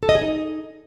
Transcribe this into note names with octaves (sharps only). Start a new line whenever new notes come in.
A4
D#5
G#4
D#4